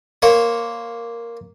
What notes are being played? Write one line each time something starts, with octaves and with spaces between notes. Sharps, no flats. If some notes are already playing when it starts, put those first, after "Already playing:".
A#3 C5 C#5